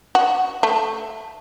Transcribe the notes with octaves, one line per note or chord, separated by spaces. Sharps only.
F#4
A3